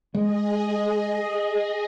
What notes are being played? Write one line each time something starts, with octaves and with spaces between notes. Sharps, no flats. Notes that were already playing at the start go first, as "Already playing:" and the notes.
G#3 G#4 D#5